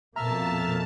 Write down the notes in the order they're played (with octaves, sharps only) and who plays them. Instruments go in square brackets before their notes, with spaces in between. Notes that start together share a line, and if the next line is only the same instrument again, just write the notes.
[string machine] F2 A5 [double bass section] B2 A#3 [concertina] E5 F6 [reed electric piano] A#5